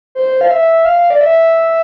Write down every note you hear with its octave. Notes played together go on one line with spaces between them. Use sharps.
C5
F5
E5
F5
D5
E5